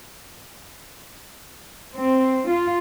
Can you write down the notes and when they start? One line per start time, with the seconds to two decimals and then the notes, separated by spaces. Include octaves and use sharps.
1.94 C4
2.48 F4